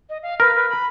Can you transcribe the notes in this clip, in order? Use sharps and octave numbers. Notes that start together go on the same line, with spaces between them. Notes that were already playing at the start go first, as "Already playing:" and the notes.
D#5
F5
A#4 B4
B4
B5